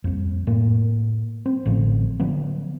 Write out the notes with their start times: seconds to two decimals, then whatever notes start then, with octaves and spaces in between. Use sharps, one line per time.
0.04 C2 F2
0.47 A2 A#3
1.46 C4
1.66 A1 A2 D3 F3
2.20 D3 F3 F#3 B3